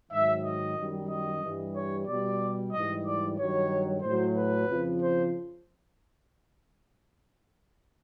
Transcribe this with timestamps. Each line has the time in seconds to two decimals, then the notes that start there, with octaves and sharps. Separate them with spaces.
0.10 G#2 D#3 F#3 E5
0.43 D#5
0.76 F#2 D#3 G3
1.08 D#5
1.41 G2 E3 G3
1.75 C#5
2.06 B2 G3 D5
2.72 G#2 E3 G3 D#5
3.05 D5
3.37 G2 D#3 F#3 C#5
4.02 A2 F#3 C5
4.35 B4
4.68 F2 C#3 F3
5.00 C5